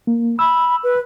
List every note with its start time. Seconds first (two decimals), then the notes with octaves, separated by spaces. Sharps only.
0.07 A#3
0.39 B5 E6
0.84 B4